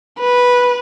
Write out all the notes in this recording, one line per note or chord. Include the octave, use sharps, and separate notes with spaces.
B4